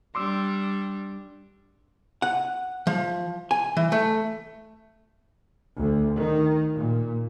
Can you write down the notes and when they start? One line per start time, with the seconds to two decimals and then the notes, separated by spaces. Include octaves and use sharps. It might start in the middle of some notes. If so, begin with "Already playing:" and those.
0.15 G3 D4 C6 D6 E6
2.22 F#5
2.87 F3
3.51 G#5
3.77 E3
3.92 A3
5.77 D2
6.18 D#3
6.74 A#2